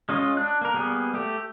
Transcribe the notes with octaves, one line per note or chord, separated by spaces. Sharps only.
G#3 C#4 F4 D#5
D4 F#6
A#3 A#4
G3 A#3 B3 G#4
A3 G4